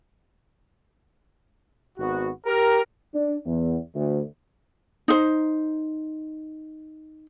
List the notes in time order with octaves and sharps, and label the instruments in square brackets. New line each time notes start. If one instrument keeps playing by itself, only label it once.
[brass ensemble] G#1 B3 F#4
G4 A#4
D4
E2
D2
[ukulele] D#4 C5